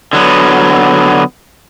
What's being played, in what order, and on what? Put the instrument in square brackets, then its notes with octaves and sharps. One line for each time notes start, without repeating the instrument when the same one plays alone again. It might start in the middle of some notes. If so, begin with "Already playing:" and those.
[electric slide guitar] D3 F#3 B3